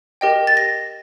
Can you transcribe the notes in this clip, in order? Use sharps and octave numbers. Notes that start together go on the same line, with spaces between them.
G4 A#4 D#5 G5
A6
A#6